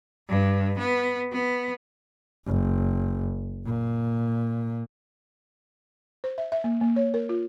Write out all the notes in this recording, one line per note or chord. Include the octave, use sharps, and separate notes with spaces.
G2
B3
B3
F#1
A#2
C5
E5
E5
A#3
A#3
C#5
A#4
F4